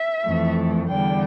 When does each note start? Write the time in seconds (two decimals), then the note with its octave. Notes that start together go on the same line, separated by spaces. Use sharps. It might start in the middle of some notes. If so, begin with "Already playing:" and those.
Already playing: E5
0.25 F2 E3 A3
0.90 E2 D3 G3 G5